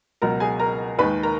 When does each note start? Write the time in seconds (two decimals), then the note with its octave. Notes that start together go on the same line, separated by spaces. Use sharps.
0.22 C#2 B2 F#3 A#4 A#5
0.40 G#4 G#5
0.60 A#4 A#5
0.99 D#2 D#3 G#3 B4 B5
1.23 A#4 A#5